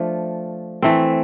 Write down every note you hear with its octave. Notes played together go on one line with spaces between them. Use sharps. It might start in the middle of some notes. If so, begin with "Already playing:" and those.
Already playing: F3 A3 D4 F4
E3 A3 C4